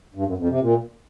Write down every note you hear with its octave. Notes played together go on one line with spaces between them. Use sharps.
G2
F#2
F2
C3
A#2